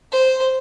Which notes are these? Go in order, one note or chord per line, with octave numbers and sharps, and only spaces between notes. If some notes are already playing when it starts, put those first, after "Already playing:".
C5